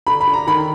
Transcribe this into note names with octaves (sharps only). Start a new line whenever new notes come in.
D3 B5
B5
D3
A#5
D#3 B5